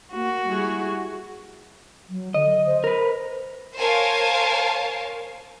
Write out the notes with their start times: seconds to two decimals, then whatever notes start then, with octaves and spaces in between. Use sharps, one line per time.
0.14 A#3 F#4
0.47 G3 E4 G#4
2.09 F#3
2.34 D3 D#5
2.66 C5
2.84 A#4 B4
3.77 A#4 C5 C#5 F5 G#5 A5